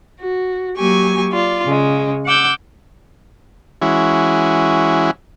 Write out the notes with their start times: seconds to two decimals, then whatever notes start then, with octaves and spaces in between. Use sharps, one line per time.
0.19 F#4
0.77 F#3 A#3 G4 G#5 C#6
1.32 F4 D5
1.65 C#3 G#3
2.25 F#5 D6 E6 G6
3.82 E3 G#3 C#4 E4 F#4